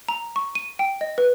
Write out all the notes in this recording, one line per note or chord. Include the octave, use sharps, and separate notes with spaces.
A#5
C#6
D#7
G5
D#5
B4